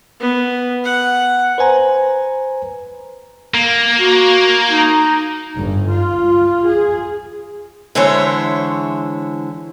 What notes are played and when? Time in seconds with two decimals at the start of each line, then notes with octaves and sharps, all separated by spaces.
0.20 B3
0.85 F#5
1.58 B4 C5 G#5 A#5
3.54 A#3
4.00 F#4
4.71 D#4
5.54 G1
5.90 F4
6.67 G#4
7.95 D3 E3 G#3 E4 C5 C#5